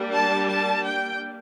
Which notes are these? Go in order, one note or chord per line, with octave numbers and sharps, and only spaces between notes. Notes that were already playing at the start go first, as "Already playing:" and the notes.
Already playing: G3 A#3 D4
A5
A5
G5